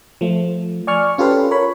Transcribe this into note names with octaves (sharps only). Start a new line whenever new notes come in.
F3 A3
D5 G#5 C#6 F6
C#4 F4 G4 A4 B4 F5
A#4 C#5 B5